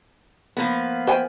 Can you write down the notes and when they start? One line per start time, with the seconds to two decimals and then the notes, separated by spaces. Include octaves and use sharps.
0.57 F3 A#3 B3
1.07 C5 G5 G#5